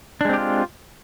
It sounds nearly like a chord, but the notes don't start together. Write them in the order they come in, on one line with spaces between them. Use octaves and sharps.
D4 G#3 C4 G4 F4